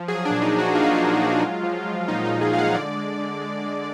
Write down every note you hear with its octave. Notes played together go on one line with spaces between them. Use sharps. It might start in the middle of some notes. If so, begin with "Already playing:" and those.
Already playing: F3
F#3 G#4
D4
A#2
D#4
F#3
F#4
A#2 F4
D#4
F4
A#2
F#3
G#3
F3
G#3
A#2 D#4
D#4
A#2
G#4
G#3 F5
F#5
D3 D5
G#3
D3
G#3
G#3